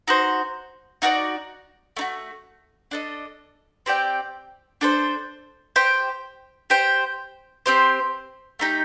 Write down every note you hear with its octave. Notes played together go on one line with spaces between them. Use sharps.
D#4 F#4 C5
D#4 F#4 A4 D5
A3 D#4 F#4
D4 A4 D#5
C4 G4 D5 G5
D4 A4 C5
G4 C5 G5
G4 C5 G5
C4 G4 C5
A3 D#4 G4